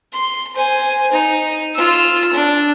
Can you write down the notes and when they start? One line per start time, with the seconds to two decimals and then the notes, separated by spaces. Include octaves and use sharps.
0.13 C6
0.55 C5 G#5
1.12 D#4
1.75 F4 E6
2.33 D4